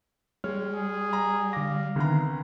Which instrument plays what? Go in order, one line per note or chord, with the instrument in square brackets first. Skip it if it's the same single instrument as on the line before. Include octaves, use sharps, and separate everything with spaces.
[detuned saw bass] G3 [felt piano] G#3 C#5 [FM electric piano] F6
[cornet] G#4
[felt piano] A#5
[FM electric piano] D3 A#6 [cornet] F5 [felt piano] D6
[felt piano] C2 B3 A#5 [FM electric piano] D3 D#3